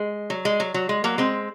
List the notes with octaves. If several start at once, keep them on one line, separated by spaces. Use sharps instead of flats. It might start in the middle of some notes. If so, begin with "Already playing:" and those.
Already playing: G#3
F#3
G#3
F#3
F#3
G#3
F#3 A#3
G#3 C4